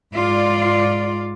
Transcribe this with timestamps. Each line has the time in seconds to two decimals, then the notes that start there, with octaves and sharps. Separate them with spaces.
0.13 G#2 F4 D5